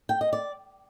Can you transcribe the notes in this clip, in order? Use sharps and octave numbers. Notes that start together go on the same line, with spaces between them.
G5
D#5
D5